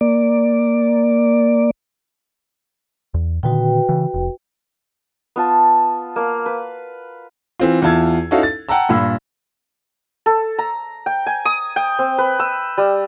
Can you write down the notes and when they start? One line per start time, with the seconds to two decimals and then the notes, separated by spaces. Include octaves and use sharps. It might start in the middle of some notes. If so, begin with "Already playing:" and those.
0.01 A#3 D5
3.14 E2
3.43 A#2 D3 D#3 F#4 B4 G5
3.89 C#3 E3
4.14 F1
5.36 B3 F4 A5
6.16 A#3 F5
6.46 B4
7.60 E3 C4 F4
7.82 E2 E4 F4 A5 E6 G#6
8.31 C#4 D#4 E4 F#4 A4 F5
8.43 A6
8.69 F#5 G5 A5 A#5 E6
8.89 G2 A#2 B5 E6
10.26 A4
10.59 A#5
11.06 G5
11.26 G#5
11.45 D#6
11.76 G5
11.99 C4
12.18 B4
12.39 E6
12.78 G3